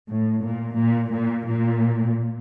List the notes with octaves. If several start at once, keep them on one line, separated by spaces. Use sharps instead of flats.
A2
A#2
A#2
A#2
A#2